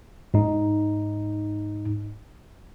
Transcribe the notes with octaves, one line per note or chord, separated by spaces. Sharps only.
G#2 D#4